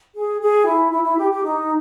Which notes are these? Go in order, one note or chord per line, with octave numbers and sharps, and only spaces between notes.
G#4
G#4
E4
E4
E4
G4
G4
D#4